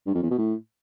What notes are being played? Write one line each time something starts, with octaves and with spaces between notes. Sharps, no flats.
G2
F2
E2
B2
A2